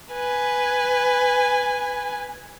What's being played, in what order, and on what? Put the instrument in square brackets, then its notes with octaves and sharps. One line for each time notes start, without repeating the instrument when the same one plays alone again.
[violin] B4 G#5